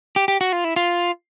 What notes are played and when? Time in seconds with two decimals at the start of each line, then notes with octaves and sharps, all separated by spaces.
0.16 G4
0.28 G4
0.41 F#4
0.53 F4
0.64 E4
0.76 F4